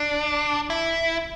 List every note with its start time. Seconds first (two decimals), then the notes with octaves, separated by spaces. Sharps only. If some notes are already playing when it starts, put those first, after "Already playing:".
Already playing: D4
0.70 E4